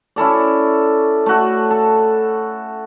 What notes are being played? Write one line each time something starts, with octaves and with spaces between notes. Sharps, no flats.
C#4 E4 A4 D5
A3 F#4
A4